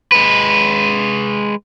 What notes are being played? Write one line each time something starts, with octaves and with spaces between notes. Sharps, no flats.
G#3 B4